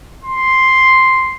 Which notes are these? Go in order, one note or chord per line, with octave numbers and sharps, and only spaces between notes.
C6